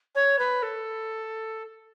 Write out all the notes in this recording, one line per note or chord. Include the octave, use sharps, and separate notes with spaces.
C#5
B4
A4